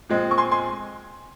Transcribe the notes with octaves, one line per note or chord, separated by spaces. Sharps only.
A#2 F3 G#3 C4
C#6
G#5 C6
G#5 C6